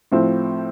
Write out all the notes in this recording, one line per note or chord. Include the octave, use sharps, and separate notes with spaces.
A2 F3 C4